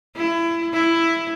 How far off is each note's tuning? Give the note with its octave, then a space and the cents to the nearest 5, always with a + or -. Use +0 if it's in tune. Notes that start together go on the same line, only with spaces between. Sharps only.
E4 +25
E4 +10